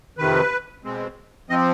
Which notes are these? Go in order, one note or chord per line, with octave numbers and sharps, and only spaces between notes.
F2 C3 D#3 B4
B2 G#3 C4
F3 C4 D#5